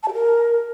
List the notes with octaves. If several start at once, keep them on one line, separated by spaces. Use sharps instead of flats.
A5
G4
A#4